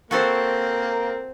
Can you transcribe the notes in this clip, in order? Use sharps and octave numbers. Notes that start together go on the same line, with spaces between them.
A#3 C4 F#4 A4 A#4 C5